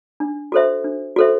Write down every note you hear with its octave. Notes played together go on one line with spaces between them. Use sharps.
D4
F#4 A4 C5 E5
D4
F#4 A4 C5 E5